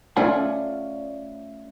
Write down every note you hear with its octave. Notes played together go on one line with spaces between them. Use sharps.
A3 C#4 F4 D5 F#5 G#5